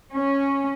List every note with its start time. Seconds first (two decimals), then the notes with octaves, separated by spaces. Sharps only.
0.12 C#4